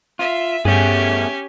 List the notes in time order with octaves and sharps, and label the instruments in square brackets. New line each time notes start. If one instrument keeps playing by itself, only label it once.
[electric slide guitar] F4 [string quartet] E5
[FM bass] G2 [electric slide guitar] A3 B3 G#4 [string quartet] C#4 G4 G#5